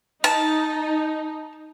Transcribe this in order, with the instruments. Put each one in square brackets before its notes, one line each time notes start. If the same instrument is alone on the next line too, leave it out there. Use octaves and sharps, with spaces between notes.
[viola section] D#4 [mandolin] A5